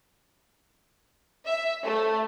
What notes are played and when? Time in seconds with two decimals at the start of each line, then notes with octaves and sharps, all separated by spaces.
1.46 E5
1.84 A3